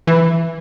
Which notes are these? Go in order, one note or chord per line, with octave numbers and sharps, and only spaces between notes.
E3